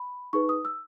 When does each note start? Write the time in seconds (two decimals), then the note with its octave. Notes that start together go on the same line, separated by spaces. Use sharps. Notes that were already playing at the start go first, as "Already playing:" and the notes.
Already playing: B5
0.33 D#4 G#4 B4 C#6
0.49 D#6
0.65 E6